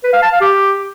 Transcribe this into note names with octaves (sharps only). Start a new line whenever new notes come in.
B4
F5
A5
F5
G4